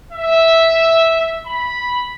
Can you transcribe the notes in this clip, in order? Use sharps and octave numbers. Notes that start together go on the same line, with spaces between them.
E5
B5